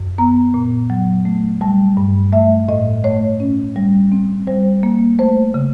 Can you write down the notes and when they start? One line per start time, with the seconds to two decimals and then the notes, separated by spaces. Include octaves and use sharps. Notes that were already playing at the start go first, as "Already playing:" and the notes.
Already playing: F#2
0.18 B3 A#5
0.54 A#2
0.90 F#3
1.25 A3
1.61 G3 A5
1.97 G2
2.32 A3 E5
2.68 A2 D#5
3.04 A3 C#5
3.40 C#4
3.76 G3
4.12 C4
4.47 G3 C5
4.83 A#3
5.19 A3 C5
5.54 C#3